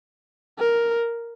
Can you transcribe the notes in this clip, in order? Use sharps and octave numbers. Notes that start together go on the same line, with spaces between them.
A#4